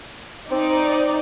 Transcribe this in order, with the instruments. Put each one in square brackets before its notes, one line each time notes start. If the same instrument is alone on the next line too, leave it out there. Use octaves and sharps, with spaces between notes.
[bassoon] C4 [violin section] D#4 D5